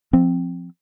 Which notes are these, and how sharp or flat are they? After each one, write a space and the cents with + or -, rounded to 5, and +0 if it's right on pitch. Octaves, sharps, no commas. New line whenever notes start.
F3 +0 C4 +0